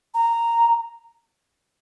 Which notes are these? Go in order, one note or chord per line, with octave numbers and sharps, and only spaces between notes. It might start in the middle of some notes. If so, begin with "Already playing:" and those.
A#5